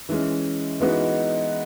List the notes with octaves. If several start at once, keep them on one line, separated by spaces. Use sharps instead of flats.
E3 G#3 C#4
E3 G#3 B3 D#4 F#4